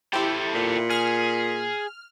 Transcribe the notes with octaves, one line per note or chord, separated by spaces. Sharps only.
E4 G4 A4 C5
A#2
G#4 F6